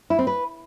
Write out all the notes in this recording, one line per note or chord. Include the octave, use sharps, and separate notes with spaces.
E4
C4
B4